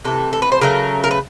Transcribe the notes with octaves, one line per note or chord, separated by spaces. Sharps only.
C3 E3 A3 A4
A4
B4
C5
C#3 F#3 A3 A#4
A#4
B4